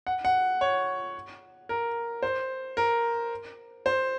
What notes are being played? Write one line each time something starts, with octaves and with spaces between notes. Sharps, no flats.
F#5
F#5
C#5
A#4
C5
A#4
C5